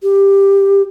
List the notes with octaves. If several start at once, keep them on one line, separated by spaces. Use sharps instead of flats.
G4